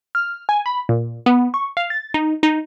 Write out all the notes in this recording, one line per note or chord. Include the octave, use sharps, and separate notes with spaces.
F6
G#5
B5
A#2
B3
C#6
F5
A6
D#4
D#4